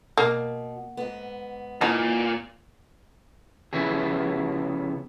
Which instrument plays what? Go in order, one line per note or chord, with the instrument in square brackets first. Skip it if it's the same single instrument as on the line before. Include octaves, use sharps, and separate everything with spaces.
[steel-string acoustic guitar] B2 [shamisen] A#3
[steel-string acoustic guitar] G#2 B3
[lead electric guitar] A#2 [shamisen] E3 D#4
[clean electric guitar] C#3 F3 B3 E4 G#4